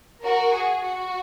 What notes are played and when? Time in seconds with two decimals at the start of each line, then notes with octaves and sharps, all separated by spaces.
0.23 F#4 A#4
0.53 G#4
0.83 F#4